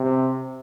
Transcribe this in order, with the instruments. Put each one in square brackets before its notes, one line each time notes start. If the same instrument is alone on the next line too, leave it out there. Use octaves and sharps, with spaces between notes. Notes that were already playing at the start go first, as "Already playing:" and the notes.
Already playing: [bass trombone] C3